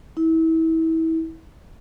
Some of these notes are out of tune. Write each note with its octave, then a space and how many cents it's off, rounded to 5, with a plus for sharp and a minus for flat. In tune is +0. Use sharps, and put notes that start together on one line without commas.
E4 -30